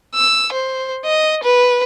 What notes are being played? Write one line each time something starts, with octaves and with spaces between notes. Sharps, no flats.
E6
C5
D#5
B4